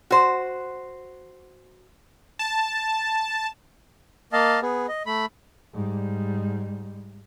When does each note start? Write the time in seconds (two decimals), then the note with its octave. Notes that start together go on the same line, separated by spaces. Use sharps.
0.11 F#4 C5
2.39 A5
4.33 A#3 D#5 F5 A5
4.62 B3 G#4
4.88 D#5
5.06 A3 B5
5.73 G#2 G3